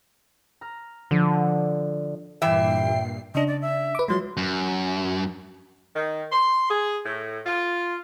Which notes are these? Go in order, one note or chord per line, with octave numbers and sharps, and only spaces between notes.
A#5 F6
D3 F3 D#7
G2 A#2 E3 E5 G5 C7
C#3 D4 D#5
D5
E5
B4 D6
F3 F#3 G#3 C6
F#2
D#3
C6
G#4
A2
F4